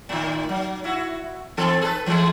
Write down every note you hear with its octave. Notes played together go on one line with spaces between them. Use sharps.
A2 D#3
F#3
E4 F#4
E3 C4 A4
G#4 A4 B4
E3 G#3 A3